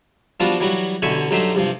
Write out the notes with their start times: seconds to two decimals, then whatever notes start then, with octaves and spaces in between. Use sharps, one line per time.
0.40 F3 G3 B3 D4 F4 F#4
0.60 E3 F#3 G3 F#4
1.02 A1 B2 D3 E5 G#5 C#6
1.31 G2 F#3 A3 D#4 E5 C6
1.55 G2 C3 F3